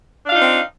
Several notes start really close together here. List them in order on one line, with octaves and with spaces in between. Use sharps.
D4 F5 F4 D#4 C4